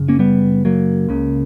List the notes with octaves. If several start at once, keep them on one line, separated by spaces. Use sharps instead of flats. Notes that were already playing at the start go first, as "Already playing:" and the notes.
Already playing: F#1 C#3
A#3 C#4
G3 B3
F#3 A#3
C#2 C#3